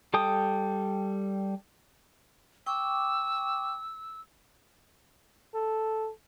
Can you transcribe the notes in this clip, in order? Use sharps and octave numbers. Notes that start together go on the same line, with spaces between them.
G3 A4 G5 D#6
G5 C#6 D6 E6
A4